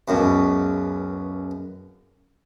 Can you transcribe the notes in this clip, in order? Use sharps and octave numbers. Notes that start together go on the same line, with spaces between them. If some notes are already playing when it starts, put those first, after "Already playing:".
C#2 F#2 B2